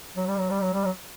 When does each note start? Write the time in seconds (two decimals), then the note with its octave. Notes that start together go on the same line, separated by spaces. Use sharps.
0.16 F#3
0.28 G3
0.39 F#3
0.50 G3
0.62 F#3
0.73 G3
0.85 F#3